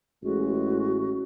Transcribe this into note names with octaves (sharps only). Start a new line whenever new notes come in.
A1 G#3 F#4